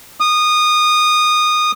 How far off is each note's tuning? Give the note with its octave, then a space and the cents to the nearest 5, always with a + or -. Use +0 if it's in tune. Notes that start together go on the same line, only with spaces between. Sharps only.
D#6 -20